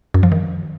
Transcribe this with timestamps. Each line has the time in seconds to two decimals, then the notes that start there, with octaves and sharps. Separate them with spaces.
0.14 F#2
0.23 F3
0.32 D#3